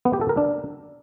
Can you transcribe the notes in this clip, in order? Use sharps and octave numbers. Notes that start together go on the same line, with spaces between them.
B3
G4
A4
A#4
D4